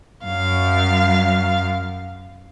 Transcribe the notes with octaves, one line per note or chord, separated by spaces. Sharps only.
F#2 F5